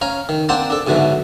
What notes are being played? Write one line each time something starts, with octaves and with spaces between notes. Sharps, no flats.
C#4 C#5 F5 A#5
D#3
A#3 C4 D4 C5 F#5 A5
D4 A4
G#2 B2 D3 E3 F#3